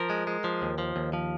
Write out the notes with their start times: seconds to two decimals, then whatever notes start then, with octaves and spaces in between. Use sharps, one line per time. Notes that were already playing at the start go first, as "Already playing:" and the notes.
Already playing: F3 A#4
0.10 G#3
0.27 G#3
0.44 F3
0.62 D#2
0.78 F3
0.96 D#2
1.13 F3